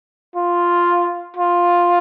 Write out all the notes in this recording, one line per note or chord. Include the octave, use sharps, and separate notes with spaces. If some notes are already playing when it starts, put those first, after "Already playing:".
F4
F4